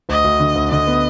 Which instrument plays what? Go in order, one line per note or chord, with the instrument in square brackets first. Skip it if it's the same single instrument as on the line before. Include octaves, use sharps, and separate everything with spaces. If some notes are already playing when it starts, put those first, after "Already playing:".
[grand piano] D2 [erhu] D#5
[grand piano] D2
D3
D2
[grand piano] D3 [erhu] D#5
[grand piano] B3